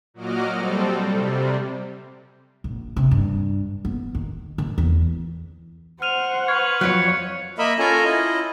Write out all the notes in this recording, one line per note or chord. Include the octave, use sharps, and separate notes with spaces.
A#2 F#3 F#4 D#5 D6 F6
G3 C4 A4
C3 G3
A#1
C3
G2
B3
D#3
D#3
E2
C5 F#5 F6 D#7 F7
B4 C#6 F6 G#6
F2 F3 F#3 F4 C#5 F#6 B6 C#7
A#3 A#4 D#5 E5 B5
C#4 F4 A4 A#4 G#5 A#5
E4 F4 D#5